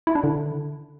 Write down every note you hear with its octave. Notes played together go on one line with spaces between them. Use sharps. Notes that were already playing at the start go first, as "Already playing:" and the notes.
E4
D4
D3